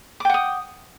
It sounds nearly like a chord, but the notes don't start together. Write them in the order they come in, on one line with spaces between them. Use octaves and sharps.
D6 G5 F#5 D#6